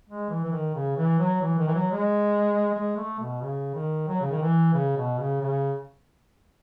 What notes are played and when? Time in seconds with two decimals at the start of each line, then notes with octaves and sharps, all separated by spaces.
0.08 G#3
0.30 E3
0.44 E3
0.52 D#3
0.75 C#3
0.97 E3
1.19 F#3
1.41 E3
1.58 D#3
1.68 E3
1.74 F#3
1.91 G#3
2.74 G#3
2.96 A3
3.19 B2
3.41 C#3
3.74 D#3
4.08 F#3
4.21 C#3
4.31 D#3
4.42 E3
4.74 C#3
4.97 B2
5.19 C#3
5.41 C#3